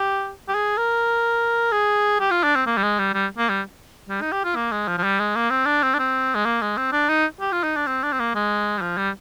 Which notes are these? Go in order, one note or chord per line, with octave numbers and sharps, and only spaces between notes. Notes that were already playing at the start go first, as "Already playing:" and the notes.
Already playing: G4
G4
G#4
A#4
G#4
G4
F4
D4
C4
A#3
G3
G#3
G3
G3
A#3
G3
G3
D#4
G4
F4
A#3
G#3
F3
F3
G3
G#3
A#3
C4
D4
C4
D4
C4
G#3
A#3
G#3
C4
D4
D#4
G4
F4
D#4
D4
C4
D4
C4
A#3
G#3
G3
F3
G3